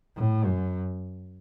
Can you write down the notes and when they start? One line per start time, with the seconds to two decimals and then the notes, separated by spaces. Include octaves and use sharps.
0.16 A2
0.45 F#2